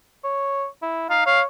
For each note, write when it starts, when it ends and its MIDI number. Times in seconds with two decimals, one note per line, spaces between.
0.24 0.66 73
0.83 1.05 64
1.10 1.23 63
1.10 1.22 77
1.26 1.45 73
1.26 1.41 77